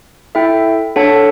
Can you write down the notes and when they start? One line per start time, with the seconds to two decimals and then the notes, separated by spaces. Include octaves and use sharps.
0.35 E4 A4 E5 G5
0.96 D4 A4 C#5 F#5 A5